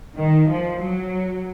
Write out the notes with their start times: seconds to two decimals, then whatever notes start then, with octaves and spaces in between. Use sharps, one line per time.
0.16 D#3
0.49 F3
0.81 F#3